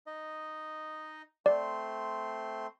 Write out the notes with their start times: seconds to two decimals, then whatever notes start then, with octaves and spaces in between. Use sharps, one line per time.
0.07 D#4 D#5
1.46 A3 C4 D5 C6